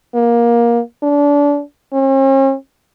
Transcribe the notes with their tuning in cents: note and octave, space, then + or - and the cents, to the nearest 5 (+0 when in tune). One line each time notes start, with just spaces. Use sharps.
A#3 +15
D4 -30
C#4 -45